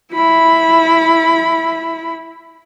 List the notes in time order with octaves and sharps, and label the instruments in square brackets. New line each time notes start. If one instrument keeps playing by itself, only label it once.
[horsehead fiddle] E4 B5